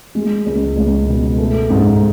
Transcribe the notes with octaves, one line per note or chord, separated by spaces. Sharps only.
G#3
C#2
C#2
B2
A3
G#2